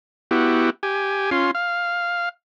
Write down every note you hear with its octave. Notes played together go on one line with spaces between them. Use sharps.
B3 E4 F#4 G4
G4 G#5
C#4 F4 C6
F5